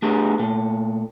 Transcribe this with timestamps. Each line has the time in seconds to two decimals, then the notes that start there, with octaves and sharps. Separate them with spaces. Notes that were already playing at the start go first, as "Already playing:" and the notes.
0.02 A3 B3 D4 G4 G#4
0.39 A#2 A3